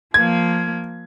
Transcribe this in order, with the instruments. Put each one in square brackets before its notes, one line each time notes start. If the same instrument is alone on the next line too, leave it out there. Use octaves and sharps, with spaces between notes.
[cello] F3 A#3 [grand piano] G#6